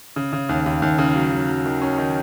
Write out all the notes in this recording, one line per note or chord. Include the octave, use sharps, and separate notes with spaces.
C#3
C#3
D#2
D#2
D#2
C#3
F#3
F#3
F#3
D#3
C#4
D#3